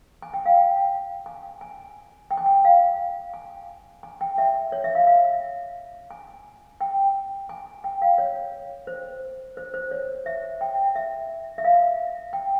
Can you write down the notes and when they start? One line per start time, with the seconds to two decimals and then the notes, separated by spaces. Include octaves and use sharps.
0.22 G#5
0.34 G5
0.46 F5
0.57 G5
1.26 G#5
1.61 G#5
2.31 G5
2.38 G#5
2.46 G5
2.65 F5
3.34 G#5
4.03 G#5
4.21 G5
4.38 E5
4.72 C#5
4.84 E5
4.95 F5
5.07 F5
6.11 G#5
6.81 G5
7.49 G#5
7.84 G5
8.02 F5
8.18 C#5
8.87 C5
9.57 C5
9.74 C5
9.91 C#5
10.26 E5
10.61 G5
10.95 E5
11.58 E5
11.64 F5
12.33 G5